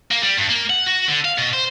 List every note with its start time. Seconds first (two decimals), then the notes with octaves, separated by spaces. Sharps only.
0.11 A#3
0.23 G3
0.38 G2
0.49 A#3
0.70 F#5
0.87 F#4
1.08 D3
1.25 F5
1.38 B2
1.53 C5